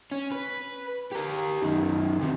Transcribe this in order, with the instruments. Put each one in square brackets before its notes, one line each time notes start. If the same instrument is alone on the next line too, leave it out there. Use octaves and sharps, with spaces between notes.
[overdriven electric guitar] C#4
B4
G4 A#4
F#2 D#3
D2 C3